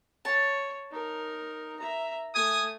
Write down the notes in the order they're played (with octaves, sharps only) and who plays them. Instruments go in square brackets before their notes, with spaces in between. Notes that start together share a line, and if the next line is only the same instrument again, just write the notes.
[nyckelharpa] C#5 [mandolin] A5
[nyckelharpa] D#4 A#4
E5 A#5
[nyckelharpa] A3 [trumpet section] G#5 D#6